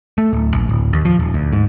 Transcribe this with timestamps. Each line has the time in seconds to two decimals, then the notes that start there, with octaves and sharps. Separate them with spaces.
0.18 A3
0.33 D1
0.54 A#1
0.69 D1
0.93 D#2
1.05 F3
1.19 D#1
1.34 D2
1.53 G#2